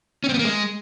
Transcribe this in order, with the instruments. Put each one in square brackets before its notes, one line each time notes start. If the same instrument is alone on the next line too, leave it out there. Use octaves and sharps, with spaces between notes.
[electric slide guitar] C#4
C4
B3
A#3
G#3